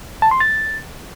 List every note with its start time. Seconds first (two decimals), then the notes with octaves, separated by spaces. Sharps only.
0.22 A5
0.31 C6
0.40 A6